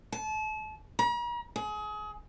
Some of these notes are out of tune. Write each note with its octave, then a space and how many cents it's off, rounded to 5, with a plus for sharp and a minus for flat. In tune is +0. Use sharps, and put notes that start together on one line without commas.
A5 -35
A#5 +45
G#4 +30